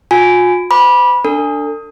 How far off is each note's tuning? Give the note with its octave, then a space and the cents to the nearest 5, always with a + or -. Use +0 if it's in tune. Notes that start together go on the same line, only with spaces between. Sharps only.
F4 +45 G#5 +0
C5 -25 B5 -20 D6 +0
D4 +0 A4 +35